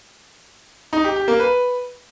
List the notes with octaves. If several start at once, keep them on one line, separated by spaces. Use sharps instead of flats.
D#4
G4
G4
A#3
B4